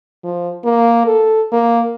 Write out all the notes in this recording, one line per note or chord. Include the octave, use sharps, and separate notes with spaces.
F3
A#3
A4
A#3